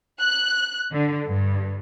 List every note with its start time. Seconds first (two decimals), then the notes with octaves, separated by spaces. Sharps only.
0.20 F#6
0.92 D3
1.27 G2